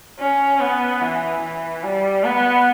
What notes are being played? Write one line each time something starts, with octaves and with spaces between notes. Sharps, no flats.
C#4
B3
E3
E3
G3
B3